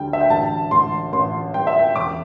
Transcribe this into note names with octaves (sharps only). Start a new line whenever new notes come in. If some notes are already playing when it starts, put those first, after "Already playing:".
Already playing: D2 G3 G5
E5
G5
A1 A5
A1 C6
A1 C6
G3 G5
E5
G5
E1 D6